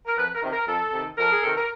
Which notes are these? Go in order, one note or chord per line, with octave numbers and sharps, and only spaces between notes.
A#4
F2 B4
A#4
C3 D#3
A#4
F2 A4
C3 D#3
F2 A#4
G#4
C3 D#3 A4
A#4